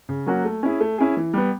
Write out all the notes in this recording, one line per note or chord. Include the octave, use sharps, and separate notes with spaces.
C#3
F#3 A#3 C#4 F#4
A3
C#4 E4 G#4
A3
C#4 E4 G#4
E3
G3 B3